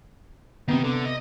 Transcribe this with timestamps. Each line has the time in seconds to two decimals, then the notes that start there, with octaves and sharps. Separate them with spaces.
0.68 C3 D#3 B3 D#4
0.84 D3
1.05 D#5